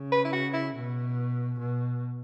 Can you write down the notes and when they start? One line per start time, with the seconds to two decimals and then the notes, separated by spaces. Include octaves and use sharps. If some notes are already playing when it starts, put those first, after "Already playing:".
Already playing: C#3
0.12 B4
0.25 E4
0.33 F#4
0.53 E4
0.75 B2
1.59 B2